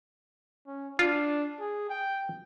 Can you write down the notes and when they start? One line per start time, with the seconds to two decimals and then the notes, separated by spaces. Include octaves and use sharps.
0.66 C#4
0.99 D4 F4
1.59 G#4
1.89 G5